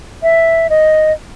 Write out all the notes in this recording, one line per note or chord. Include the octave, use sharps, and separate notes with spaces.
E5
D#5